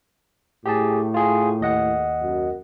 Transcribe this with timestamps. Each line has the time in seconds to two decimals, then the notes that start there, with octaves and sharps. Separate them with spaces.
0.66 A2 G4 G#4 A5
1.14 F4 G#4
1.61 D#2 D#5 F#5
2.22 F#2